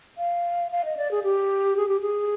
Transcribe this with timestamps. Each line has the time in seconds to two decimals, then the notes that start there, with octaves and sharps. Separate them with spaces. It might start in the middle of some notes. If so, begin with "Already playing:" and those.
0.18 F5
0.72 F5
0.85 D#5
0.97 D5
1.11 G#4
1.23 G4
1.77 G#4
1.88 G4
2.01 G#4